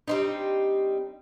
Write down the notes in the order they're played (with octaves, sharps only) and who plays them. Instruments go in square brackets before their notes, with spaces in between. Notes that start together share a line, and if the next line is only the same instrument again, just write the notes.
[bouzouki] G3 C4 D#4 [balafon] D4 D#5